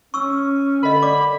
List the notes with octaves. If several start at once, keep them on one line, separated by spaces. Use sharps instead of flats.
C#4 C#6 E6
D3 A#4 D#5 B5
D5 D6